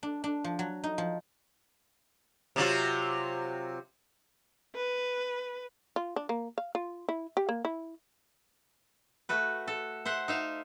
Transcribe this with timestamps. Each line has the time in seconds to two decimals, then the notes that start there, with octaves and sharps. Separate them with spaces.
0.03 D4
0.24 D4
0.44 F3
0.59 F#3
0.84 D#4
0.98 F3
2.56 C3 F#3 F4
4.75 B4
5.96 F4
6.16 D4
6.29 A#3
6.58 F5
6.75 F4
7.09 E4
7.37 G4
7.49 A#3
7.65 E4
9.29 A3 F#4 B4
9.68 A4
10.05 C5 E5 F#5
10.28 D#4 E5 F5